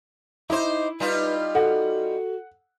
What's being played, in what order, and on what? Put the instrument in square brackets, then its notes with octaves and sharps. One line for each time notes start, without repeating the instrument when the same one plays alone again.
[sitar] D#4 C5 [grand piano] E4 [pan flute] D6
[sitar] G3 D#4 F4 [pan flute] B4
[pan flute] F#4 [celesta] A4 [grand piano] F#5